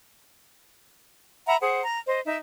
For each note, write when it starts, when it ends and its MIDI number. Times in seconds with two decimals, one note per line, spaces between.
1.46 1.55 76
1.46 1.55 78
1.46 1.55 82
1.46 1.55 83
1.60 1.81 68
1.60 1.81 72
1.60 1.81 78
1.82 1.98 82
2.06 2.19 72
2.06 2.19 75
2.24 2.37 63
2.24 2.37 76